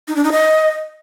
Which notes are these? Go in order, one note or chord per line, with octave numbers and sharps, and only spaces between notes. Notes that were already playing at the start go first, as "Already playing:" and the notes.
D#4
D4
D#4
D#5